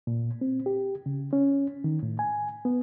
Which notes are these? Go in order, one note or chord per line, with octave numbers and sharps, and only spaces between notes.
A#2
C4
G4
C#3
C#4
D#3
A2
G#5
B3